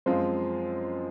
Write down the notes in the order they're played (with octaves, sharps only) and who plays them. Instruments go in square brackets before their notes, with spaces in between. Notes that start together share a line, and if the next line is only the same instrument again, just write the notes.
[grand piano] F#2 F3 G#3 C4 F4 [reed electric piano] C5